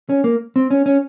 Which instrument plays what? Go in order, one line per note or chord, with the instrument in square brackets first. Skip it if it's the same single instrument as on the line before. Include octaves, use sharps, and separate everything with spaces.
[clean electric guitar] C#4
A#3
C4
C#4
C#4